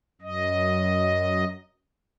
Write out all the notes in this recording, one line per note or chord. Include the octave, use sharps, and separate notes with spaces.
F#2 D#5